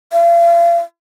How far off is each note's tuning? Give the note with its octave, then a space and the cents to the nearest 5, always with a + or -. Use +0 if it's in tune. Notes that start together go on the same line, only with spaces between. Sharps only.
F5 -40